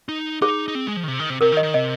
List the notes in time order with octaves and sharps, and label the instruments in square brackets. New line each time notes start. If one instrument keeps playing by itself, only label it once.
[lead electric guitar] D#4
[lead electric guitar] D#4 [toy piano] G#4
[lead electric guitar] D#4
C4
G#3
F3
D#3
C3
D#3
C3
[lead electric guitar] C3 [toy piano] A#4
[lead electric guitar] D#3
[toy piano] D#5
[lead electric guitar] D#3
[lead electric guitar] C3 [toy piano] D#5